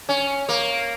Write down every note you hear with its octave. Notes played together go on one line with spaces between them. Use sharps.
C#4
A#3